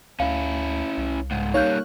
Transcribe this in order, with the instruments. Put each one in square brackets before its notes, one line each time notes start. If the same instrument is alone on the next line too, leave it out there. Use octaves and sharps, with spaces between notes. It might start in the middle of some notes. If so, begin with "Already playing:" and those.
[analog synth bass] D2 [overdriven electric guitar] C#4 E4 [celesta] F5
[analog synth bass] C2
[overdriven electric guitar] C#2 G#2
[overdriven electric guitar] G3 A#3 [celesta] D#4 G6 [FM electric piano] C#5 F5 F#6